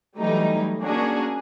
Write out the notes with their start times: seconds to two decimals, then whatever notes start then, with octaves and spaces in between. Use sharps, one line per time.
0.18 E3 F#3 G3 A3 D#4
0.81 A#3 C#4 D4 F#4 G#4